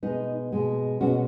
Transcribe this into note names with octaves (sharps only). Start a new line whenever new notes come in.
B2 G#3 B3 D#4
B2 G#3 B3
B2 G#3 B3 C#4 F#4